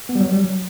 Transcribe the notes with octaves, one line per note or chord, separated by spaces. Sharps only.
B3
G3
F#3
G3
F#3